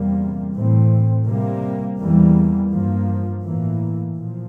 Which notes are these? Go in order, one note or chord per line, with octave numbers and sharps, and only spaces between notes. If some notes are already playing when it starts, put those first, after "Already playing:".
Already playing: E2 C3 G3 A#3
A2 E3 A3 C4
C3 G3 A#3
E2 E3 G3 A#3
G2 F3 A#3
A2 E3 A#3
A#2 F3